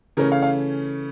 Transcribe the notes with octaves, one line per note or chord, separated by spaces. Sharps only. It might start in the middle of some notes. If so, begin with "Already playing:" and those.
C#3 E3 A3 C#4 A#4
F5
F5